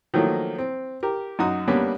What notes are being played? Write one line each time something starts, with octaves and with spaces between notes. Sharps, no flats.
D#3 F3 F#3 A3 A#3
C4
G4 A#4
F#2 D#4 F#4 D#6
G3 A#3 B3 C#4 D4